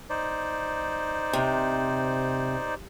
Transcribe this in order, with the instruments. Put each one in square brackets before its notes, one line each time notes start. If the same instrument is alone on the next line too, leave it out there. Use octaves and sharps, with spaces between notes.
[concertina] D#4 C5 D5
[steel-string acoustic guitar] C3